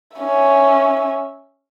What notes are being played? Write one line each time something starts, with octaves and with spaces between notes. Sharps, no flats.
C#4 E5